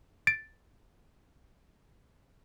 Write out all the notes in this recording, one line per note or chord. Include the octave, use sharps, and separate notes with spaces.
A6 D7